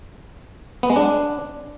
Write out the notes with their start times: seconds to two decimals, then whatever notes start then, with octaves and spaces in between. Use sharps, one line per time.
0.83 B3
0.90 G#3
0.96 D4